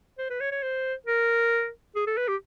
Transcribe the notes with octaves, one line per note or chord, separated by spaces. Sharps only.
C5
B4
C#5
C#5
C5
A#4
G#4
A4
B4
G4